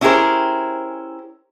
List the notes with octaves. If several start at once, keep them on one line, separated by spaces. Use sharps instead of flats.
C#4 E4 G4 G#4 A#4 C5